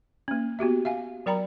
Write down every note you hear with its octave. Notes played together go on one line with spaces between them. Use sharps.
A#3 C#4
B3 F#4 G4 E5
E5 F5 G#5
F#3 A#4 D5 G5 A#5 B5